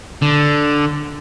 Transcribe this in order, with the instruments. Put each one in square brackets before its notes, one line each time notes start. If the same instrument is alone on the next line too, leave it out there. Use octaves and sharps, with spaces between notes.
[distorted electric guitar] D3